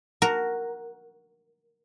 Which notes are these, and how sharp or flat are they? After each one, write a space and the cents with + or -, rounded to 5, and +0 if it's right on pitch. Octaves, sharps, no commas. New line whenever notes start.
F#4 +0 A#4 +0